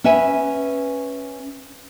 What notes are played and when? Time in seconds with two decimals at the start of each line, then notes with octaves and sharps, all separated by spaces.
0.04 C#4 B4 E5 F#5 G#5